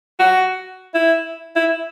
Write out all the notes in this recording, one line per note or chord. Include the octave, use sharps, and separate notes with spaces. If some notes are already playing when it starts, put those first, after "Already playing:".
F#4
E4
E4